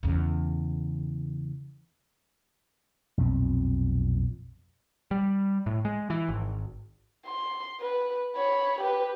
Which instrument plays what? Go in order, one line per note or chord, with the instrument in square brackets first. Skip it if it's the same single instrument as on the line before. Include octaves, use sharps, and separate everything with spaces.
[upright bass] E2 C#3
[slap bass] B1 F2 A#2 C4
[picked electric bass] G3
A2
G#3
E3
G#1
[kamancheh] C6
B4
C#5 B5
G4 B4